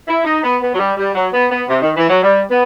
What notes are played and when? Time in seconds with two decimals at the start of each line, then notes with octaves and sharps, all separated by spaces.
0.08 E4
0.25 D#4
0.43 B3
0.61 B3
0.74 F#3
0.79 G3
0.97 G3
1.15 F#3
1.33 B3
1.51 B3
1.69 C3
1.82 D#3
1.96 E3
2.09 F#3
2.23 G3
2.49 B3